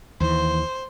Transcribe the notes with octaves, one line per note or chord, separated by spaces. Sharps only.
D#2 E3 C5